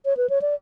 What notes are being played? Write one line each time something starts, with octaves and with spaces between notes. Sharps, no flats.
C#5
B4
C#5
D5